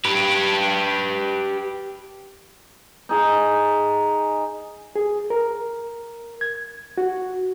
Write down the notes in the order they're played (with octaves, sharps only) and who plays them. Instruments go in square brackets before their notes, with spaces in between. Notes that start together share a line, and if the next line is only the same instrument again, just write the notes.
[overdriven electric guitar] G4 B4
[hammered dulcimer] D#4 G#4
[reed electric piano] G#4
A#4
G#6
F#4